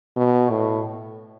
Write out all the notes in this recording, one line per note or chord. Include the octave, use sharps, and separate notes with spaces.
B2
A2